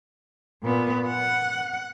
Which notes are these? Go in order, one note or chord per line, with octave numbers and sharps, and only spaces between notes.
A#2 B3
F#5